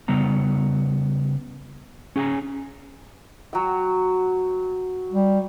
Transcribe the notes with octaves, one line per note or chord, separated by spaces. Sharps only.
C#3 G3 B3 A#5
C#4 G#4 G5 G#5 A#5
F#3 F#4 G5
G3